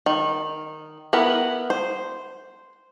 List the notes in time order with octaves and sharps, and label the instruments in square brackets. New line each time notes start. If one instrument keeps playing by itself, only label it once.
[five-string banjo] D#3
B3 E4 A#4 B4
C5